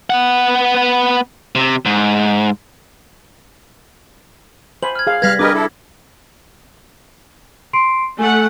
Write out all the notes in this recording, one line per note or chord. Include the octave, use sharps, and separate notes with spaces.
B3 F#5
C3
G#2
C5 G#5 B5 F#7
F6 G#6
G#4 F5
G3 B4 F5 F6 F#6 G#6 A#6 B6
D4 G4 G#4 A#4 B4 D#5 D6
E4 A4
C6 C7 D7
A3 F#5 G#5